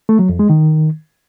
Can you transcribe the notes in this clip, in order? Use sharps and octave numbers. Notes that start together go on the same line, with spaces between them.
A3
F#3
F2
G#3
D#3